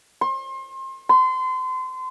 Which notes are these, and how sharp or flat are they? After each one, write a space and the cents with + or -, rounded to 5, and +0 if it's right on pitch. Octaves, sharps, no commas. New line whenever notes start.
C6 +35
C6 -30